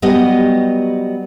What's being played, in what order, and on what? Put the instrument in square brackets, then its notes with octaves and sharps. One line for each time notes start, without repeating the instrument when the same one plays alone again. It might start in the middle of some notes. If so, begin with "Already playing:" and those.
[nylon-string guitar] F#3 G3 B3 G4 D#5